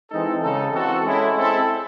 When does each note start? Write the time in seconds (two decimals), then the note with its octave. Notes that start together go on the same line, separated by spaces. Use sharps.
0.11 E3 G#3 C4 D#4 A4
0.42 C#3 G#3 D#4 A4
0.72 E3 C4 F#4 A4
1.04 G#3 C#4 E4 A4
1.35 G#3 C4 E4 A4